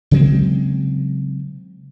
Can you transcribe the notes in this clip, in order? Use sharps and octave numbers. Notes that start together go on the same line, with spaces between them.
C#3 F#3 G#3 C4